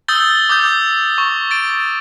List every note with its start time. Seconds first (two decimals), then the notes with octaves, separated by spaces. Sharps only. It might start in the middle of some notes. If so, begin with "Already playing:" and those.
0.08 D#6 E6 G6 A6 G7
0.49 D6 D#6 G6
1.18 C#6
1.51 A6 D7